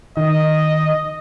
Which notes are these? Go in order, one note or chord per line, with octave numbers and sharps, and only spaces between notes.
D#3 D#5